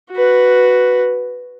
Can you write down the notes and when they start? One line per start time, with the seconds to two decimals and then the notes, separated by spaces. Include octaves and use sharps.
0.12 F#4 B4